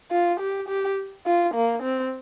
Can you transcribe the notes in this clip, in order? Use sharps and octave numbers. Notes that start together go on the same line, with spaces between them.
F4
G4
G4
F4
A#3
C4